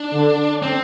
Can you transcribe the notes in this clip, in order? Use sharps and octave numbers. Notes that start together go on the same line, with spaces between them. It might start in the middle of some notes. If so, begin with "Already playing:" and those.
Already playing: D4
D3
C4